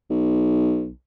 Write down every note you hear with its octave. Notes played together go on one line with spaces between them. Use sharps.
B1